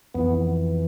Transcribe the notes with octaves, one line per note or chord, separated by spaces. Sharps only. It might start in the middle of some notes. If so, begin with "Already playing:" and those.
F2 E3 B3